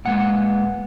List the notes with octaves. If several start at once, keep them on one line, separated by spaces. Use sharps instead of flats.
A#2 G#3 B3 F#5